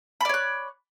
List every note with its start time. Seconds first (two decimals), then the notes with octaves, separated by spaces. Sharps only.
0.21 B5
0.25 D5
0.29 C#5
0.34 F#6